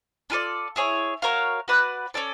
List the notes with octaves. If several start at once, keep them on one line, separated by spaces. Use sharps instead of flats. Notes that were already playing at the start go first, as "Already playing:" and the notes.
D4 F4 A4 D5
E4 G#4 C#5
F#4 A#4 C#5 F5
F#4 B4 D5 F#5
C#4 F#4 A4 D5